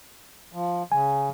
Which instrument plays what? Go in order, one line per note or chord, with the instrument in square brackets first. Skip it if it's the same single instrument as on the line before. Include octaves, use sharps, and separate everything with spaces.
[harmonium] F3
[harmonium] C#3 [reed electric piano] G#5